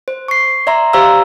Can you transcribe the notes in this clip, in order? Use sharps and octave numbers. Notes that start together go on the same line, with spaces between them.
C5
C#6 C7
D5 E5 A#5 C6
G4 C5 D5 F5 A#5 E6